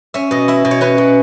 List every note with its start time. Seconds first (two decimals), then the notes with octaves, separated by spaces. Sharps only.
0.14 C#4 E5
0.31 B2 D#5
0.48 E4 E5
0.65 B2
0.71 C#5
0.81 C#4 B4
0.98 B2